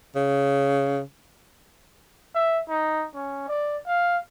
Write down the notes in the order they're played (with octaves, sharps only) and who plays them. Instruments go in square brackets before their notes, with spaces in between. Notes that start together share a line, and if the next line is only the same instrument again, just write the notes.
[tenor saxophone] C#3
[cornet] E5
D#4
C#4
D5
F5